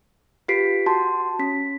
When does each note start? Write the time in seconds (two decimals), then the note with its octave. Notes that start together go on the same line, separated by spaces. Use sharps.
0.48 F4 G4 B4 B6 C7 D7
0.86 F#4 A5 C6
1.39 C#4 B6